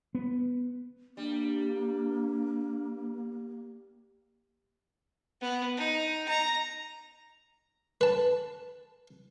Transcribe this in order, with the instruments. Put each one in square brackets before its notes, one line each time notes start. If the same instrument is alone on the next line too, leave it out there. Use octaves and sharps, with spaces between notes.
[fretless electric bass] B3
[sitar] G3 [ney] A#3 [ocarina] D4
[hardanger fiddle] B3
D#4
A#5
[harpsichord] B4 A5